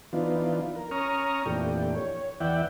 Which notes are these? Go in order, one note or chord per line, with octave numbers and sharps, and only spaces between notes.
E3 F3 B3 D4 D#4 F4
A#4
C#4 A#5 C#6 D#6 F6
F2 A#2 E3 A3 D4 G4
C#5
E2 E3 D5 E5 F#5 G5